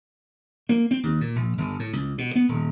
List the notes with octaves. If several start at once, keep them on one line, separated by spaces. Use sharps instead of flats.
A#3
C4
D#2
A#2
A#1
G1
A2
C#2
B2
B3
D#1